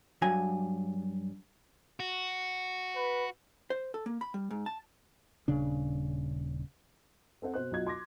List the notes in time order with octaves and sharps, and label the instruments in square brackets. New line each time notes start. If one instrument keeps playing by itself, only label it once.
[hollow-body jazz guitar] G2 F#3 G#5
[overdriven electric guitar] F#4
[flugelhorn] B4
[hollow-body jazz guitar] C5
A4
A#3
B5
G3
G#2
A5
[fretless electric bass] D#1 C#3 D4
[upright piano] C4 A4 C5 F#5
B2 C5 F#6
B1 F#3 F4 D#5 G#6
C6 D6 A#6